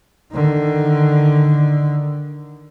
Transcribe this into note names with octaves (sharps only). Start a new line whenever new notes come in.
D3 D#3